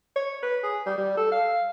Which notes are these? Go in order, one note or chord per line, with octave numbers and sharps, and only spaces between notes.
C#5
B4
G#4
G3
G3
A4
F5